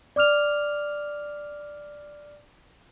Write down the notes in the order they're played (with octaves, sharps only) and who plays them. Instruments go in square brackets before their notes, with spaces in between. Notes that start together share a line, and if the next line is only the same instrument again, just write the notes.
[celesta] D5 D6 F6 F7